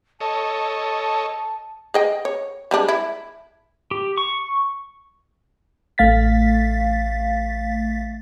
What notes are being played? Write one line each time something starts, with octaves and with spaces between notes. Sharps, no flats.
A4 C#5 D#5 A5
G#4 D#5 G5
C#5
G3 G#3 D4
E4
G4
C#6
A1 A3 F5 A6 B6